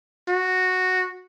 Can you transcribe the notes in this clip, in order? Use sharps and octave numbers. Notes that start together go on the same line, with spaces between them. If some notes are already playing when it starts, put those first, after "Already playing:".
F#4